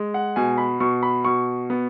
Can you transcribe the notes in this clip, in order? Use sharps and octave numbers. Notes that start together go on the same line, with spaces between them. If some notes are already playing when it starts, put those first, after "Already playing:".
Already playing: G#3
F#5
B2 G#5
B5
B2 C#6
B5
B2 C#6
B3